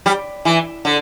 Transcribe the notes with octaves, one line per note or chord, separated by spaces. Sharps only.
G3
E3
D3